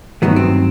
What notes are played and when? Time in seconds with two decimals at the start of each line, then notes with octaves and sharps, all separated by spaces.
0.22 G2 D#3 F#3 A3 B3
0.36 C4